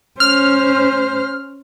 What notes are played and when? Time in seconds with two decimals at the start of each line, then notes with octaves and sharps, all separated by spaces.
0.20 C#4 C5 F6